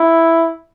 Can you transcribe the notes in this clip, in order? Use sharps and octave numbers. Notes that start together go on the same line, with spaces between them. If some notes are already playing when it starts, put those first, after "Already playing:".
Already playing: E4